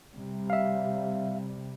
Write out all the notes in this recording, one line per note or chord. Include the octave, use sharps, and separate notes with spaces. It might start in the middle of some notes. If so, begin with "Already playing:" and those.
C3 G3
E5 F5